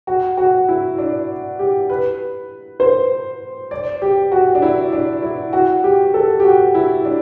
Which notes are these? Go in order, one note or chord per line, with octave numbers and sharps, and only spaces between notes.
F#4
F#4
E4
D4
G4
B4
C5
D5
G4
F#4
D4
E4
D4
E4
F#4
G4
A4
G4
F#4
E4
D4